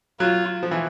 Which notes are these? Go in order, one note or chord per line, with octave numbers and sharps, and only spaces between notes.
F#3 F4
F3
E3